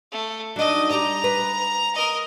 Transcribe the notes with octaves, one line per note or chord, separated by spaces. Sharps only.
A3
F#3 D4 D#4 D#5
G3 D5 A#5
B4
A#4 D#5